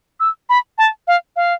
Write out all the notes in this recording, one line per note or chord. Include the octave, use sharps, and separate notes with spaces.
E6
B5
A5
F5
F5